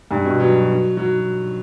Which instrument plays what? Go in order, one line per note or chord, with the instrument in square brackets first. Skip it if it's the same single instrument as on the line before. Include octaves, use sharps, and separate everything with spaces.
[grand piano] G2
B2
F#3
F#3